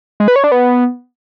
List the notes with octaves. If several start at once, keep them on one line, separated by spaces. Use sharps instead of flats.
G#3
B4
C#5
D4
B3